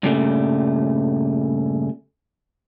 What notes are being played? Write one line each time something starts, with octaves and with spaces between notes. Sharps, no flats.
G2 A#2 C#3 G3 A3